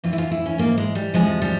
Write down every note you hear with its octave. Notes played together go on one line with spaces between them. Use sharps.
F2 E3 F4
E4
F4
E4
C#4
G#2 E3 A#3
G#3
G3
E2 C3 F3 G#3
G3